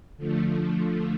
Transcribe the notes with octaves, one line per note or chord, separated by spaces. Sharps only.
D3 F3 A3